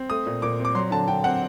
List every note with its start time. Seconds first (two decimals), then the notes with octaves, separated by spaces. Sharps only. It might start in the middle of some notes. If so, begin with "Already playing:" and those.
Already playing: C4
0.10 A3 D#6
0.27 A#2
0.42 A#2 D6
0.60 C4
0.65 D6
0.75 F#3 C6
0.91 D3 A5
1.08 D3 G5
1.24 C4 F#5